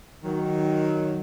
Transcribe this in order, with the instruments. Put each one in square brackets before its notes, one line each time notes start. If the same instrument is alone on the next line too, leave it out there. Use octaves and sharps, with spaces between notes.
[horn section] D#3 F#3